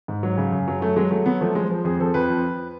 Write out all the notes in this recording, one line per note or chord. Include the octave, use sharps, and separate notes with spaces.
G#2
F#3
C#3
F#2
F#3
F#3 A3
F#3 G#3
F#3 A3
F#3 B3
F3 A3
F3 G#3
F3
F2 G#4
F3 A4
F2 B4
F3